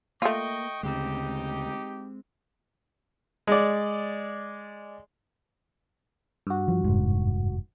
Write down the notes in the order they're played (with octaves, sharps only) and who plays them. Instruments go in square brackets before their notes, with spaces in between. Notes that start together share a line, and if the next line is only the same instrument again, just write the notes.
[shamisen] A3 F4 [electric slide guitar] A#3 [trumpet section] D#5 G5 C#6
[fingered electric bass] D2 C#3 [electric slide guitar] G#3 C4 [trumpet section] D#4 G4
[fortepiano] G#3 D5
[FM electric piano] G2 F#4
[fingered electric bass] F3
F1 G#2